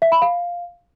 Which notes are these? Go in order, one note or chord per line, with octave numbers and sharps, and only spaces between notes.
E5
B5
F5